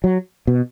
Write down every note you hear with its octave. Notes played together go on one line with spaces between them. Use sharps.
F#3
B2